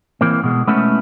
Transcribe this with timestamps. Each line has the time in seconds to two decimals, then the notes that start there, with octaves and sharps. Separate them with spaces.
0.21 E3 A#3 C4
0.44 B2 G#3
0.67 G#3 A3 B3 C#4 E4